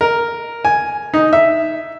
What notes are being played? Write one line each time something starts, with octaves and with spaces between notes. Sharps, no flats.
A#4
G#5
D#4
E5